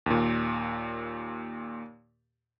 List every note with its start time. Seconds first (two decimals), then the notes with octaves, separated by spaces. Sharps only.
0.06 D#2 A#2